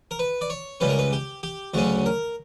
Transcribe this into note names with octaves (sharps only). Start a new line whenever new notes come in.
A#4
B4
D5
C#5
C#2 C#3 G3 C#4 B4
A#4
B4
G4
G4
D2 C#3 F#3 C#4 F#4
A#4